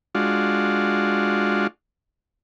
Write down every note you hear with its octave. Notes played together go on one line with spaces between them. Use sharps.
G#3 D4 F4 F#4